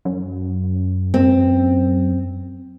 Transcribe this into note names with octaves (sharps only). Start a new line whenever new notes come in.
F#2
C4